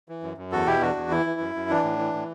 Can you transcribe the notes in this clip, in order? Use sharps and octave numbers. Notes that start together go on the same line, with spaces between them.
E3
F#2
F#2
E2 F#4 A4
B2 E4 G4
E2 D4 F#4
E2
E3 E4
E3
F#2
F#2
E3 D4
A2
E3
A2